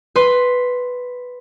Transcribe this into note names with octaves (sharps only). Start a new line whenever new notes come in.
B4 C6